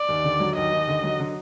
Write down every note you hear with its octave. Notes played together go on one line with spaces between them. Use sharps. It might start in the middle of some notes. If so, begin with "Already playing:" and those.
Already playing: D5
D#2
D3
F#3
D#2 D#5
D#2
D3
F#3
D3